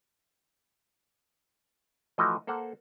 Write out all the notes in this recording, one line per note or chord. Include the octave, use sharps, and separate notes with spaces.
E3 F3 A3 F#4 D#5
A#3 A4 C5 F#5